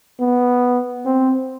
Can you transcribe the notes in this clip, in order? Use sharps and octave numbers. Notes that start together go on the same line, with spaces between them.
B3
C4